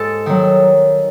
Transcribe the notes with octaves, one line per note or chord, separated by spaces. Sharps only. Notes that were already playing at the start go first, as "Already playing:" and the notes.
Already playing: G#2 A4
D#3 F#3